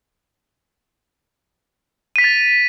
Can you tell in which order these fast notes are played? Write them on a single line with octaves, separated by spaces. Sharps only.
D#7 B6 F7 A6